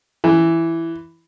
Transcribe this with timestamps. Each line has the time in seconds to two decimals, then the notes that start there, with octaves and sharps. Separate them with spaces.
0.24 E3